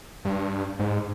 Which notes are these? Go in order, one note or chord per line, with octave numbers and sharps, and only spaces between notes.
G2
G#2